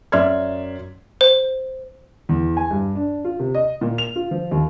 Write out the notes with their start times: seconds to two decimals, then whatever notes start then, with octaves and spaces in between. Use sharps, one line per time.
0.12 F#2 D5 E5 C6 F6 G#6
1.21 C5
2.29 E2
2.57 G#5
2.71 G2
2.96 D4
3.25 F4
3.40 C3
3.55 D#5
3.81 A#2
3.98 F7
4.16 F4
4.31 F3
4.51 D#2